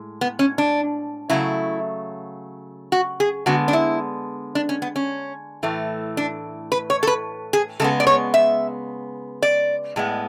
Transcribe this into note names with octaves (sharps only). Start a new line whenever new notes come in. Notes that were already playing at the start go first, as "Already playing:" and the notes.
Already playing: A2 G#3
B3
C#4
D4
C#3 F#3 A3 E4
F#4
G#4
D3 G#3 B3 F#4
D4
E4
D4
C#4
B3
C#4
A2 E3 A3
D4
B4
C#5
A4
B4
G#4
C#3 G#3 B3 A4
D5
C#5
E5
D5
A2 G#3 B3